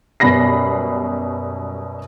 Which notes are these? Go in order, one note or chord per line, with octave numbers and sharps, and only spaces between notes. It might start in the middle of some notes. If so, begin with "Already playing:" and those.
F#2 B2 G3 B5 A#6 C7